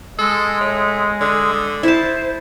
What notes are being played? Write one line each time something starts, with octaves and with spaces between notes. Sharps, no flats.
G#3 A4 D#6
A2
D3 D#6
E4 C5 A5